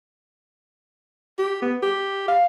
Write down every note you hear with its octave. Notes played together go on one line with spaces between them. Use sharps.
G4
B3
G4
F5